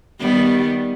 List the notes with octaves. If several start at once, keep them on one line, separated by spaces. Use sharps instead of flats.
D#3 G3 B3